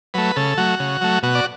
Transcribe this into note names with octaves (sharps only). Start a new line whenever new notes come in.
F#3 A3 B4
C#3 A4
F#3 A3 F#4
C#3
F#3 A3
B2 F#4
D5